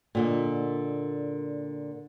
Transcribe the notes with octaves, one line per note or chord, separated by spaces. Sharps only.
A#2 D3 D#5